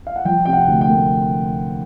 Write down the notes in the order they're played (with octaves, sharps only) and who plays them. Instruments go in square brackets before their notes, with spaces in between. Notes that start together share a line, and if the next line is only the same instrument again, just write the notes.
[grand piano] F5
F#5
F3 G5
C3 G5
F#5
D2
G5
A#3